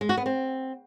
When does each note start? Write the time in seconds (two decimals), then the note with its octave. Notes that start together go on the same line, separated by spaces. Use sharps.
0.01 G#3
0.09 F#4
0.17 B3
0.26 C4